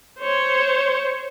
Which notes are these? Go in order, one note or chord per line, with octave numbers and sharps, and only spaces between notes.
C5 C#5